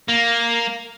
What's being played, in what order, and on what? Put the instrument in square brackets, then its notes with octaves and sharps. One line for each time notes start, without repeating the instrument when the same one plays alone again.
[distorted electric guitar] A#3